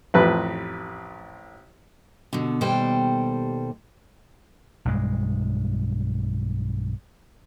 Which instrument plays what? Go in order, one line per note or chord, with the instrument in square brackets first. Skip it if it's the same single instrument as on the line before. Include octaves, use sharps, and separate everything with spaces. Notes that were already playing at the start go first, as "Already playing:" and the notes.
[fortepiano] A1 F2 B4
[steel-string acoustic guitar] B2 D3
D#2 B2 G3 A4 C5 G5
[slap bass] B1 G2 G#3